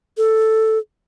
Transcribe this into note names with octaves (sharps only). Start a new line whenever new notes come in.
A4